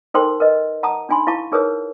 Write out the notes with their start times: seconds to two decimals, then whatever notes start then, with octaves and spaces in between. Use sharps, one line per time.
0.14 D#4 A4 A#4 C5 G5 C6
0.40 A#4 B4 D#5
0.83 F#5 A5 A#5 D#6
1.09 D4 D#4 G#5 B5 C6
1.27 E4 F5 A5 C#6
1.52 D#4 G#4 A#4 B4 C#5 D#6